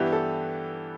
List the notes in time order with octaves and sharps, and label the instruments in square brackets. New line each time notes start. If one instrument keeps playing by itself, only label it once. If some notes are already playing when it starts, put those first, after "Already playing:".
Already playing: [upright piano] G2 E3 B3 E4 [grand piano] G4
[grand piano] A4